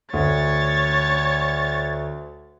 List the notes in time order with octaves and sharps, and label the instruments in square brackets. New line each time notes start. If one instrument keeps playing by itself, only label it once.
[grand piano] D2 [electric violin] C#5 A6